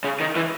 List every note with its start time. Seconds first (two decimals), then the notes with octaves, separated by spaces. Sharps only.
0.04 C#3
0.20 D#3
0.36 E3